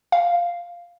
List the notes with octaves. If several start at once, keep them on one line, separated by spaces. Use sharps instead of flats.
F5